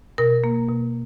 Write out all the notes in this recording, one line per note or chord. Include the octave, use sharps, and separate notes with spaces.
B2 A#4
A#3
B2